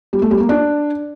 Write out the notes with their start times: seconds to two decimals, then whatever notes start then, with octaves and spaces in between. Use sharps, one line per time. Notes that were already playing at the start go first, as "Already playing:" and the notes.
0.13 G3
0.22 A3
0.31 G3
0.40 A#3
0.49 D4